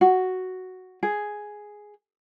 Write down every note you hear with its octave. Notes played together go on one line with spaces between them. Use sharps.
F#4
G#4